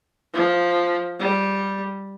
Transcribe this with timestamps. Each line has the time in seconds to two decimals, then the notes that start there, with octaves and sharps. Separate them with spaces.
0.34 F3
1.19 G3